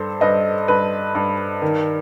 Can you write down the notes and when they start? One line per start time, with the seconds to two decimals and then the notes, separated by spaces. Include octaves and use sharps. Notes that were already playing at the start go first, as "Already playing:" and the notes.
Already playing: G2 A4 C5
0.21 G2 B4 D#5
0.68 G2 B4
1.15 G2
1.62 D#3